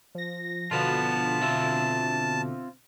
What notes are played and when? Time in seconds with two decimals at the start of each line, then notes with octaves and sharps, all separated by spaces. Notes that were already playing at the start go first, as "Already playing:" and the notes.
0.15 F3 A#6
0.71 B2 D3 F3 B3 F4 A5
1.41 C4 F4 E5